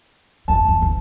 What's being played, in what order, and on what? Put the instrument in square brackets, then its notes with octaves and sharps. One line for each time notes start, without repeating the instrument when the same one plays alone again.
[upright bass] G1 F2 [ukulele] A5
[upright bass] G1 F2
G1 D2